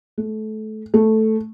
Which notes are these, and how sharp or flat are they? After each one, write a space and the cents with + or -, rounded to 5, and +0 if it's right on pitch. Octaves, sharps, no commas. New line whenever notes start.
A3 -25
A3 -5